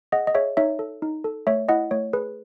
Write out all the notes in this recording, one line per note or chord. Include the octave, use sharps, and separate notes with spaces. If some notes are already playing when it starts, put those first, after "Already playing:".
G#4 D#5 F#5
D#5
G#4 C#5 E5
D#4 C#5 E5
A4
D#4
A4
A3 C#5 E5
E4 D#5 F#5
A3 C#5
G#4 B4